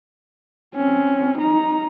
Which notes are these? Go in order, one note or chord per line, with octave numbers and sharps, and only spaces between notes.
C4 C#4
D#4 A#5